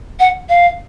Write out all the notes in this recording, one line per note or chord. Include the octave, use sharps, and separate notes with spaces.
F#5
F5